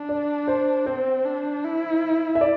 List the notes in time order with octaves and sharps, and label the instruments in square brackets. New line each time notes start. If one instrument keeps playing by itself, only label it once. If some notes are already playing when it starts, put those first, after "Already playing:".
Already playing: [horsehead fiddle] D4
[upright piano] D5
C5
[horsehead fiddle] C4 [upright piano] C5
[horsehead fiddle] D4
E4
[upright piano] E5
D5